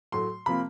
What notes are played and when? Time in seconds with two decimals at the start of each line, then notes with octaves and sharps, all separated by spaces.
0.12 A2 F#3 A3 C6
0.46 C3 F3 A#3 B5